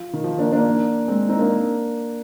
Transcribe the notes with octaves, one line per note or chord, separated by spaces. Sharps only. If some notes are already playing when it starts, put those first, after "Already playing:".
Already playing: F3
D#3
F3
A#3 D4
A#3 D4
G#3 C4
C4 D#4
A#3 D4